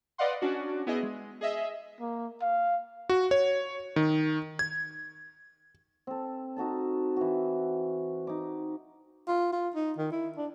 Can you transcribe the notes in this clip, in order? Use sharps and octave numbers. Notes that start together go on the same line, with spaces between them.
B4 D5 D#5 F5 F#5 C6
C#4 D4 F#4 D5
B3 E4 G#4 D#5
G#3
G#4 D#5 E5
A#3
F5
F#4
C#5
D#3
G#6
C4 A4
D#4 F#4 A4 A5
E3 F#4
D#4 D6
F4
F4
D#4
D#3
E4
D4